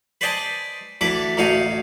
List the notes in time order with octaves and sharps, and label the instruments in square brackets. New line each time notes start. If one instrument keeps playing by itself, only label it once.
[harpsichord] B4 C5 D5 D#5 G#5 A5
D2 E3 D4 A4 B4 D6
A1 D2 D#4 F#4 F5 G#5